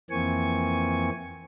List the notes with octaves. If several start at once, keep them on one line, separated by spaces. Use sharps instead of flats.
F2 E3 A#3 C4 G#5 C#6